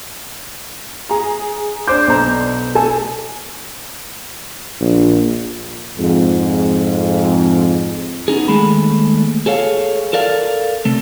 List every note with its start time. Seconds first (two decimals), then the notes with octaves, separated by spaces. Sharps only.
1.09 G#4 A#5
1.88 D4 C5 D6 G6
2.08 B1 C5 A#5
2.75 A4 G#5 A5
4.81 A#1
5.98 F2 G#2
8.28 B3 C#4 D#4 G#4
8.48 D#2 G#3 A3 B5
9.46 G#4 A4 C#5 F5
10.13 A4 A#4 D5 F5
10.85 C3 A3